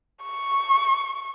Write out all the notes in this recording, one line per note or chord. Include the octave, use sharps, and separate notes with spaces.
C#6